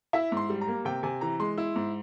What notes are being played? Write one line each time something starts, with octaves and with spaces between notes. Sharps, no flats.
E4 E5
G#2
C6
G3
A#5
A#3
C3 G5
C3 G#5
E3 A#5
G#3 C6
E4
G#2